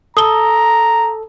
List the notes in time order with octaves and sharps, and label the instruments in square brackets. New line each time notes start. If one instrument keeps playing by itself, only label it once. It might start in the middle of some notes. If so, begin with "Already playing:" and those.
[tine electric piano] A4 [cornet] A#5 [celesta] D#6 G7